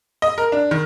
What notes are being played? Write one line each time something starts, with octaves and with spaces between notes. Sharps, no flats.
D#5
A#4
D4
D#3